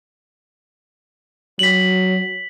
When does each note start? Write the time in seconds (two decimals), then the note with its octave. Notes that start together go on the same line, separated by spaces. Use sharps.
1.59 F#3 B6 F#7